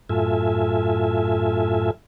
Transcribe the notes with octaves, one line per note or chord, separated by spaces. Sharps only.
F#2 A2 F4 A4 E5 G#5